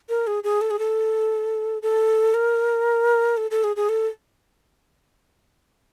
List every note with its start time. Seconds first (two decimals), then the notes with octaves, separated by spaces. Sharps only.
0.09 A#4
0.27 G#4
0.44 G#4
0.61 A4
0.71 G#4
0.79 A4
1.82 A4
2.34 A#4
3.37 A4
3.51 A4
3.64 G#4
3.76 G#4
3.89 A4